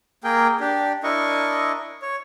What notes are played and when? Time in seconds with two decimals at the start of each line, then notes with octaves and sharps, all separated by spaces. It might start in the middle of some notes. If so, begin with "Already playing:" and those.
0.24 A#3 G#4 A#4 G5
0.60 D4 G4
1.03 D4 E4 A#4 D#5 C#6
2.02 C#5